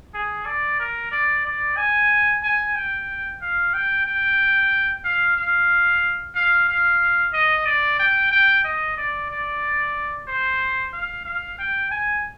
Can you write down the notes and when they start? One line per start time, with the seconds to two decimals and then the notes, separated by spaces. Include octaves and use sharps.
0.14 G#4
0.46 D5
0.80 A#4
1.11 D5
1.45 D5
1.77 G#5
2.43 G#5
2.75 G5
3.41 F5
3.74 G5
4.06 G5
5.04 F5
5.37 F5
6.35 F5
6.68 F5
7.33 D#5
7.66 D5
7.99 G5
8.31 G5
8.64 D#5
8.97 D5
9.30 D5
10.27 C5
10.93 F5
11.25 F5
11.59 G5
11.91 G#5